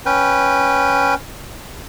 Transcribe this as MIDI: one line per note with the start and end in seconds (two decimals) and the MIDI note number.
0.06 1.15 61
0.06 1.15 71
0.06 1.15 79